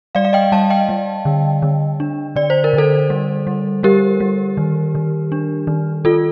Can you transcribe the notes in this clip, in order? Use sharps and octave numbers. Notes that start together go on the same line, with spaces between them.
G3 D5 F5
F5
D#5 G5
G3 F5 A5
D#5 G5
G3
D3
D3
D4
D3 D5
C5
A#4
D3 A4 C5
G3
G3
G3 G4 A#4
G3
D#3
D#3
D4
D#3
D#3 F4 A4